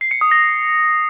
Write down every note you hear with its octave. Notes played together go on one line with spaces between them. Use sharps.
C7
C#7
D#6
A#6